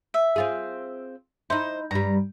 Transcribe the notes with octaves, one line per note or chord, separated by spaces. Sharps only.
E5
C4 F4 G#4
D#4 E4 C5
G2 G3 A#5